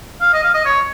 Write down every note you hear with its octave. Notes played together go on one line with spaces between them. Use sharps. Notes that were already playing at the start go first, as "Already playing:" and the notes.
F5
D#5
F5
D#5
C#5